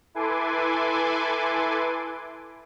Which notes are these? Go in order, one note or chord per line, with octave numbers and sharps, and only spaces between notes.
E4 A4 B4 G#5 C6 D6